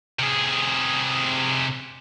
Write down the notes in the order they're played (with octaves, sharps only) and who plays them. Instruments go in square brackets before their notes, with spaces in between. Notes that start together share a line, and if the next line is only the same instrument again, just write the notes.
[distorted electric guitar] C3 G#4